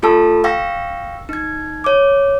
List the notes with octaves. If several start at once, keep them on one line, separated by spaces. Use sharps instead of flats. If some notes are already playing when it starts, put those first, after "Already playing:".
A3 F4 G4 A4 A5 E6
F5 G5 C#6 E6 A#6
D#4 G#6
C#5 D6